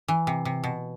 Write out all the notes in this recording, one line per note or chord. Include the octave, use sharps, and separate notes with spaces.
E3
C3
C3
B2